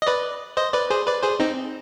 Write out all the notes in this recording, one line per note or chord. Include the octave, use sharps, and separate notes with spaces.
D#5
B4 D5
C5 D#5
B4 D5
G#4 C5
B4 D5
G#4 C5
C4 D#4